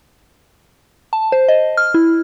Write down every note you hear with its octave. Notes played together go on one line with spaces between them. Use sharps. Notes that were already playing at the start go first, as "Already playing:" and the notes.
A5
C5
D#5
F6
E4